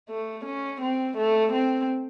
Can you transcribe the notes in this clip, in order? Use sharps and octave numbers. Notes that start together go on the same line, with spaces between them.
A3
C#4
C4
A3
C4